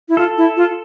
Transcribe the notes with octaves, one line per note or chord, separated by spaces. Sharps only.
E4
F4 A4
E4
F4